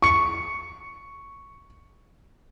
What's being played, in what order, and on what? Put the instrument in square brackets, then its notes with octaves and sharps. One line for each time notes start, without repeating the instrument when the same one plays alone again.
[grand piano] C#6 C#7